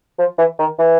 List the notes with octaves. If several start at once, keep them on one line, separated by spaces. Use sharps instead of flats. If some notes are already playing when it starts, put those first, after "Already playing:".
F3
E3
D#3
E3